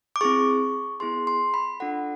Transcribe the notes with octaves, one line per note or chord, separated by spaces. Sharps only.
D6
C4 E4 G#4 C#6
B3 E4 G#4 C6
C6
B5
D4 F4 A4 F#5